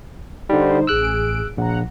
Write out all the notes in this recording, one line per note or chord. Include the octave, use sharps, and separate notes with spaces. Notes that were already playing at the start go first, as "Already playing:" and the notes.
D3 G3 D#4 C5
A1 G#4 E6 F#6 D7
A#1 F#5 A#5